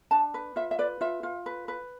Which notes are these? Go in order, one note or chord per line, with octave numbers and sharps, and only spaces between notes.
D4 A5
B4
F4 E5
E5
B4 D5
F4 E5
F4
B4
B4